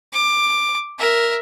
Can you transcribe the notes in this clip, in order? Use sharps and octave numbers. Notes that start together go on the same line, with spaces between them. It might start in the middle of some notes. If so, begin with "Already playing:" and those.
D6
A#4 E5